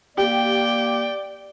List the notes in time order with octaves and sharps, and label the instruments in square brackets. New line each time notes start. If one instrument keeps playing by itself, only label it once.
[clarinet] A#3 [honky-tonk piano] G4 [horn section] D5 [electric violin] G5